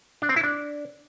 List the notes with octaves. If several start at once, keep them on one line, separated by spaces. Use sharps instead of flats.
D4
C4
E4
D4